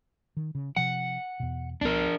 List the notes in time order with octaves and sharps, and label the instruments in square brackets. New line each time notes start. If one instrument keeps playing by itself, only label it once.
[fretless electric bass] D#3
C#3
[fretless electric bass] C3 F3 [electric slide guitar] F#5
[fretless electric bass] E2 B2
[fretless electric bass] C#2 B3 [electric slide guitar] D4 A#4